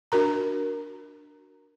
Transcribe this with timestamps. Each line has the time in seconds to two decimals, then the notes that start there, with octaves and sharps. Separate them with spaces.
0.12 D4 F#4 A#4 A#5